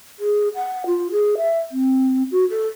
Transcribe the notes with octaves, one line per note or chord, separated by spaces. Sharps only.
G#4
F#5
F4
G#4
E5
C4
F#4
A4